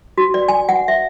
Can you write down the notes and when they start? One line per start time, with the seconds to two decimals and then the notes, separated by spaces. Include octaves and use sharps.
0.18 F#4
0.34 D5
0.48 G#5
0.69 F#5
0.88 E5